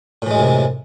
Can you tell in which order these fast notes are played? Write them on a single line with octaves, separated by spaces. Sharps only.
A2 E3 G#3 F#2 C3